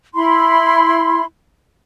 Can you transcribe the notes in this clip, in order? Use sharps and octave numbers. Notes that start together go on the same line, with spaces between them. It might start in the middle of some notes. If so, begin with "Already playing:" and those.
E4 B5 C6